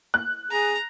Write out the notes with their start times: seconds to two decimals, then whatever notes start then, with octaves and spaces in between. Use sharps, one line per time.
0.14 F#6
0.51 G#4 A#5